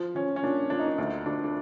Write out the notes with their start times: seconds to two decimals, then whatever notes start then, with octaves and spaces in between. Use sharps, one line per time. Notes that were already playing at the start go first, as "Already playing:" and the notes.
Already playing: F3
0.15 F3 C#4
0.36 C#4
0.43 A#2 D4
0.70 A#2 D4
0.79 D#4
0.87 D4
0.98 D2 D#4
1.26 D2 D4
1.44 D4